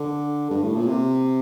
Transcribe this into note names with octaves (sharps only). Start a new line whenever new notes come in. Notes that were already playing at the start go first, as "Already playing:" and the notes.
Already playing: D3
G2
A2
A#2
C3